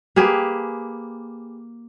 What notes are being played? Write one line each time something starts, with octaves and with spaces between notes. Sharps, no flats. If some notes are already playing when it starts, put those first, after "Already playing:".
A#3 G4 G#4 B4